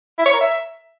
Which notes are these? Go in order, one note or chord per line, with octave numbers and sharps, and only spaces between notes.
E4
C#5
A#4
E5